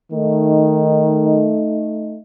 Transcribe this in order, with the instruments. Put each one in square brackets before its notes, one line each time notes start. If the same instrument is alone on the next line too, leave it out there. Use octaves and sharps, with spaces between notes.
[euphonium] D#3 [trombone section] A3 D#4